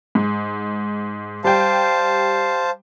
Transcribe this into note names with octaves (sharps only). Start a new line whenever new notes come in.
G#2
G3 C5 F5 G5 A5